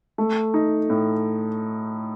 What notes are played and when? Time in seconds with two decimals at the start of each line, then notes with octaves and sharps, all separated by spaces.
0.18 A3
0.54 D#4
0.90 A2